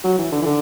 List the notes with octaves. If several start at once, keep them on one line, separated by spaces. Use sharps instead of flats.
F#3
E3
D3
E3
D3